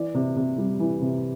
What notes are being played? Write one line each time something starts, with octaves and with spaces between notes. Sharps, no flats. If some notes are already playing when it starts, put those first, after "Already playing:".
Already playing: E3 D5
C3
C3
G3
E3
C3